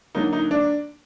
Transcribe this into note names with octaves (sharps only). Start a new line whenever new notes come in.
D3 F#3 A#3 D#4
D#4
D4